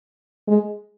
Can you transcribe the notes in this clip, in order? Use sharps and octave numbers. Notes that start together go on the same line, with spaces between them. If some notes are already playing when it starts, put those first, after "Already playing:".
G#3